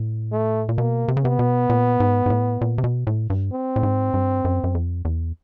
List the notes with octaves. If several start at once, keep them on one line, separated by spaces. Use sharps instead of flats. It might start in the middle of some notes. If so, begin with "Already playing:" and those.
Already playing: A2
A3
A#2
B2 A#3
C3
C#3
C3 B3
B2
A#2
G#2
G#2
A2
A#2
C3
B2
A2
G2
C4
A2
G#2
G2
F#2
F#2
F2
E2